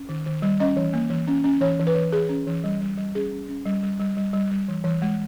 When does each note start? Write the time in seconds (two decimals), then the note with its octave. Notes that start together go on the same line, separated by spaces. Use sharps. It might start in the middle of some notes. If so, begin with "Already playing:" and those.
Already playing: C#4
0.09 D#3
0.26 D#3
0.42 G3
0.60 C#4 D#5
0.77 E3
0.93 A#3
1.10 E3
1.28 C#4
1.44 C#4
1.61 E3 C#5
1.79 E3
1.87 B4
1.95 E3
2.12 E3 G#4
2.29 C#4
2.47 E3
2.64 G3
2.81 G3
2.98 G3
3.15 C#4 G#4
3.32 C#4
3.48 C#4
3.66 G3
3.83 G3
3.99 G3
4.17 G3
4.33 G3
4.51 G3
4.68 E3
4.84 E3
5.02 G#3